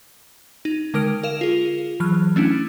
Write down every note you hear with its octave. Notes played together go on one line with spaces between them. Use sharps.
D#4
D3 G#3 A#4 F6 D7
A#4 F5 E7
F4 G#4
E3 F#3 F6
A3 C#4 D4 E4